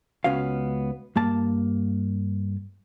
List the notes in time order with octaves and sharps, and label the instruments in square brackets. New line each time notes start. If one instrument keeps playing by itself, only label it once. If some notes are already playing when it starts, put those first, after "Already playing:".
[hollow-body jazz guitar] C#2 B3 C#4 F#4 F5
G2 A#3 A5